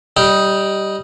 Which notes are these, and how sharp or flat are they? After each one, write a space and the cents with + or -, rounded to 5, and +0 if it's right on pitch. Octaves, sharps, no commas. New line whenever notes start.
G3 -10 D#4 +5